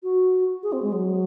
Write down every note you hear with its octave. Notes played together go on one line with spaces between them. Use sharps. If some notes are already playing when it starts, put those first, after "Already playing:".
F#4
G#4
C4
G#3
F#3